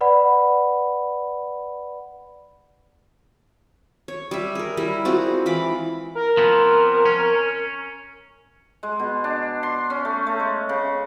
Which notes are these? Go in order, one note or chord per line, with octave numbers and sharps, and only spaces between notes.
B4 D5 F#5 B5
C#5
G3 E5
G#4 A#4
G3 E4
G#3 C4 F4 F#4
E3 F4 B5 D6
A#4
F3 B3 C4
C#4
G#3
B2
D4
C6
C#4
A3
A3
G#3
C#3